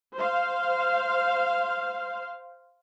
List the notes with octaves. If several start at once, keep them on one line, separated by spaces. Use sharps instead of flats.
C5 F5